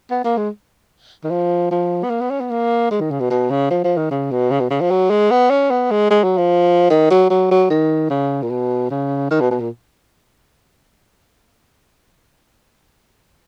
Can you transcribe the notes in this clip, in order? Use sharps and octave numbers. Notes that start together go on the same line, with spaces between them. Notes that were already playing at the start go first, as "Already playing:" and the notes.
B3
A#3
G#3
D#3
F3
F3
B3
A#3
B3
C#4
B3
A#3
G#3
D#3
C#3
B2
B2
C#3
F3
F3
D#3
C#3
B2
C#3
B2
C#3
F3
F#3
G#3
B3
C#4
B3
G#3
G#3
F#3
F3
D#3
F#3
F#3
F#3
D#3
C#3
A#2
B2
C#3
D#3
B2
B2
A#2